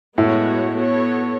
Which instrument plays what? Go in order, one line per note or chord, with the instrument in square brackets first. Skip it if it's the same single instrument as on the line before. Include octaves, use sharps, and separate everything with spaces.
[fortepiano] A2 [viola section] G#3 B3 F#4 C#5
[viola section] B3 F#4 A4 C#5